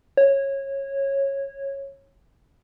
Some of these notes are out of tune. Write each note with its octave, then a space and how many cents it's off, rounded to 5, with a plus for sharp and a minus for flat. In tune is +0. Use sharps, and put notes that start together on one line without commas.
C#5 -15